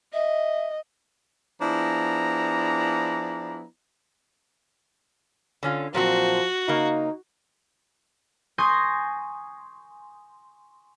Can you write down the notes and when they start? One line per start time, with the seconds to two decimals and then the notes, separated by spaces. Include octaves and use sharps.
0.13 D#5 E5
1.62 F3 B3 D4 E4 G#4 A#5
5.63 D3 C#4 F4
5.94 A#2 F3 F#3 C4 F#4
6.68 C#3 A#3 D#4
8.58 G#5 C6 C#6 D#6 G6 A#6